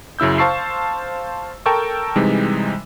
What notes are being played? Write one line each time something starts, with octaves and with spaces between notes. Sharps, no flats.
F#2 C#3 E4 E6 G6
C5 F5 A5 C#6 E6 C7
A4 A#4 G5 A5 C#6 E6
C3 E3 G3 G#3 D#4